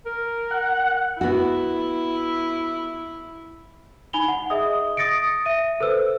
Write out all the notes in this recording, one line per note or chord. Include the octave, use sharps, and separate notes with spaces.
A#4
F#5
B3 E4 F#4
D#4 G#5 B5 F7 G7
F#5
G#4 D#5 E5 D#6
D#6 A6 A#6 C#7 D7
E5 D#7
A4 B4 C5 E6